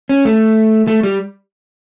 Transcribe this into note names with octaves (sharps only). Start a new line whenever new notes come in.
C#4
A3
A3
G3